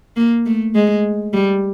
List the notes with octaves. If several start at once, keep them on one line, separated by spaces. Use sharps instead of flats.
A#3
A3
G#3
G3